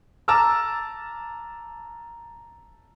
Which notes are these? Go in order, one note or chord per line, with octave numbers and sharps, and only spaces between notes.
A5 A#5 D6 E6 F6